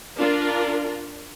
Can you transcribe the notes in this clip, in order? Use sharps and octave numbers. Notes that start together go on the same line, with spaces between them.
D4 F4 A#4